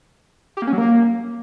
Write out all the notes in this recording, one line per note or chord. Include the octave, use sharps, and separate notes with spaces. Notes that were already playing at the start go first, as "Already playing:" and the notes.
G4
A#3
C#4
F#3
A#3